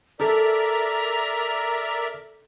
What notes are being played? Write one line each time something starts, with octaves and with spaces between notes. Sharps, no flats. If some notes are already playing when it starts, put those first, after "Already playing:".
A4 A#4 D5 E5 A#5